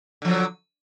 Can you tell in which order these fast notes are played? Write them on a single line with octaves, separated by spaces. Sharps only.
D3 F3 F#3